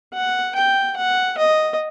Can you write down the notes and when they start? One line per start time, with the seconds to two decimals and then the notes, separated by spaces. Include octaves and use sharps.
0.13 F#5
0.55 G5
0.96 F#5
1.38 D#5